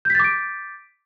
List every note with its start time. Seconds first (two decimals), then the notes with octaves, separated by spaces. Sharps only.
0.05 G6
0.10 B6
0.15 A6
0.20 D6
0.24 D7